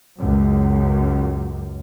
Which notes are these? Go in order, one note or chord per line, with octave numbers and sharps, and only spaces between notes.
C#2 F#2